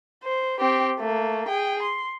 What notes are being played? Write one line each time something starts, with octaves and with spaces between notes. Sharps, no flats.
C5
C4 G4
A3 A#3
G#4 G5
C6